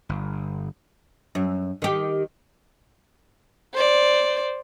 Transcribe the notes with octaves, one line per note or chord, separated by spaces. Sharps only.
G1
F#2
D#3 G4
C5 D5